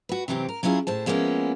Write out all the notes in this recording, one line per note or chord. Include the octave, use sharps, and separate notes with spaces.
F#4 B4
C3 E3 F#3 C4 G4
A#4
F#3 C#4 E4 F4 G#4
A2 C5 A5
F3 G#3 A#3 B3 C#4 E4